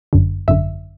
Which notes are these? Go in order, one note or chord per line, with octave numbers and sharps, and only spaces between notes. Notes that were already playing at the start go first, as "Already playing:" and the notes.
G1 F#2 D3
G#1 F#2 D3 E5